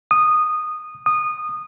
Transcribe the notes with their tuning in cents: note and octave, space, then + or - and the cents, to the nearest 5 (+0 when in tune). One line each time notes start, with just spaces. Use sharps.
D#6 -15
D#6 -20